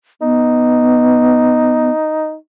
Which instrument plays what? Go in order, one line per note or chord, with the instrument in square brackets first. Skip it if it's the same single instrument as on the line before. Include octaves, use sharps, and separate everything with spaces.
[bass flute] B3 [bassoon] D#4